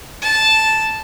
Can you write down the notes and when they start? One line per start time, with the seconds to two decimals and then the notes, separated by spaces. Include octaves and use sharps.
0.22 A5